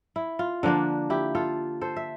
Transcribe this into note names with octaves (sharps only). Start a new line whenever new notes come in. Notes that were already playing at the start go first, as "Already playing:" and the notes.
E4
F4
D3 F3 A#3 D4
E4 G4
F4 A4
A4 C5
E5